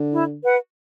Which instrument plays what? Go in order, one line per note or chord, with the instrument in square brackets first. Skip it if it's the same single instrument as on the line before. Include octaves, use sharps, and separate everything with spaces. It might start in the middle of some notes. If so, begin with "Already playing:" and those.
Already playing: [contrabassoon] D3
[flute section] E4
B4 F#5